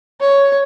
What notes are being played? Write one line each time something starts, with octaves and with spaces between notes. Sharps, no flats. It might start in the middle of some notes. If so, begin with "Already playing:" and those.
C#5